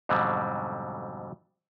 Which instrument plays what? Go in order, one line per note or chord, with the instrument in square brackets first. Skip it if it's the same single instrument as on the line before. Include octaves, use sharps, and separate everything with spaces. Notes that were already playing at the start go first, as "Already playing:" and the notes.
[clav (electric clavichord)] F2 G#2 B2 D3 F#3 G3